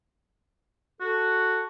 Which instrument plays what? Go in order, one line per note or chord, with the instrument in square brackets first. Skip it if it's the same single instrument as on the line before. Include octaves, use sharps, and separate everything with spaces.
[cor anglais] F#4 [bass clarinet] A4